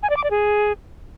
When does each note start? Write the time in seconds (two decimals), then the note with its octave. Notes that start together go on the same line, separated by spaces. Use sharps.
0.03 G#5
0.10 D5
0.17 D6
0.24 D5
0.31 G#4